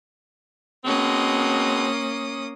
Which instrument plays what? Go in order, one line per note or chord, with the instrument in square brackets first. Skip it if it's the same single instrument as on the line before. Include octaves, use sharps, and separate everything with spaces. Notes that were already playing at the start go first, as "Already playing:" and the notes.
[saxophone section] B2 G#3 C4 [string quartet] A#3 C#4 D#6